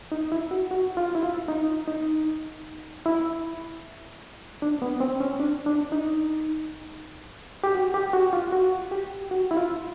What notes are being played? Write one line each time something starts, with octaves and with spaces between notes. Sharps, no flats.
D#4
E4
F#4
F#4
F4
E4
F4
D#4
D#4
E4
D4
B3
C4
C#4
D4
D4
D#4
G4
F#4
G4
F#4
F4
F#4
G4
F#4
E4
F4